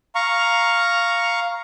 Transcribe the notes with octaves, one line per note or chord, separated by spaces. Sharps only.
F5 A#5 C#6